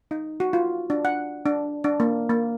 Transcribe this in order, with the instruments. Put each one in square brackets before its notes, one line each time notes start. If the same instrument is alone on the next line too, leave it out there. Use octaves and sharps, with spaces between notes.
[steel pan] D#4
F#4
F4
D4
F#5
D4
D4
A#3
A#3